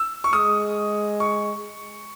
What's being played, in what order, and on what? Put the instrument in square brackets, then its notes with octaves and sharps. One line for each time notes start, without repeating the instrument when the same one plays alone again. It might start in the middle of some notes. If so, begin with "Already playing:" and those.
Already playing: [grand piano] E6
C#6
[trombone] G#3 [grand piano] D#6
[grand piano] C#6